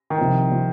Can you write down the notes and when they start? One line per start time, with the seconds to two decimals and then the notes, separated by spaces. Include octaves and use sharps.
0.10 D#3
0.18 C2 C3 F3
0.51 C3 F3